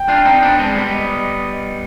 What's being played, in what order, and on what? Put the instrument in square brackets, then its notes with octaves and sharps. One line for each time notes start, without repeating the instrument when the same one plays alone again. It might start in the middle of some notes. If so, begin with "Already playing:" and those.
Already playing: [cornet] G5
[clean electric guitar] D4 F4
C4 D#4
B3 D4
G#3 C4
G3 B3
[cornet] D#5